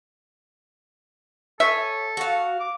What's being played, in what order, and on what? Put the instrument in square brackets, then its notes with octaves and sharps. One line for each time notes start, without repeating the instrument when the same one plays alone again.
[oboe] A4 [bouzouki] C#5 G#5 [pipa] E5
[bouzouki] F#4 F5
[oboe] D6